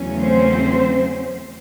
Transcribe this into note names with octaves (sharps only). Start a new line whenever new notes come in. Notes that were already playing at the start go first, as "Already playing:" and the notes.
Already playing: E2 C#3 F#3 A3 C#4
C4 C5